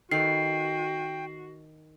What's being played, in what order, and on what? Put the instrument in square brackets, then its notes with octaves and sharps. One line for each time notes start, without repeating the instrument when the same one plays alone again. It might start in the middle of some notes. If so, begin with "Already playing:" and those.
[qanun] D#3 A4 B4 [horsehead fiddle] F#4 [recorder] G5 [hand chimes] C7